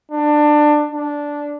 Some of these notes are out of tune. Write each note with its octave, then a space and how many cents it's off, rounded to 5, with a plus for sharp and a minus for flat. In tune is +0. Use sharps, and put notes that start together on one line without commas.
D4 +20
D4 -10